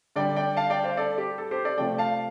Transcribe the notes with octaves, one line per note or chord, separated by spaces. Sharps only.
D3 G3 D5 G5
D5 G5
F5 A5
D5 G5
C5 F5
A4 D5
G4
A4
G4 C5
A4 D5
C3 F3 A3 D5 G5
F5 A5